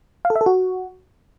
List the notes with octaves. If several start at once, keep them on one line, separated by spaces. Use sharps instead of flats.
F5
A4
E5
A4
F#4